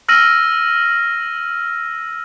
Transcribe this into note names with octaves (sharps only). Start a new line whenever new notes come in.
E6 F6 A#6 D#7 F#7